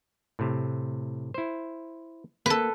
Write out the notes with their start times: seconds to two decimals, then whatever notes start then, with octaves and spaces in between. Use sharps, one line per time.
0.39 A2 C3
1.34 E4 C5
2.46 A#3 A4 B4